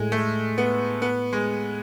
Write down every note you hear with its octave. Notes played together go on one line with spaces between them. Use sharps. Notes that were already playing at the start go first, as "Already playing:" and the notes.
Already playing: A2 G#3
A3
B3
B3
G#3